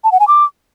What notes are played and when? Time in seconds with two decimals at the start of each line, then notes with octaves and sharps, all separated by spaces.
0.04 A5
0.12 F#5
0.20 G#5
0.28 D6